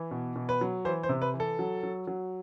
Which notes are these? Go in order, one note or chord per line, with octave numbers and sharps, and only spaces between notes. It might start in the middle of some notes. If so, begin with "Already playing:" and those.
Already playing: E3
B2
B2
B4
F#3
E3 C5
C5
C3
B4
E3
A4
F#3
F#3
F#3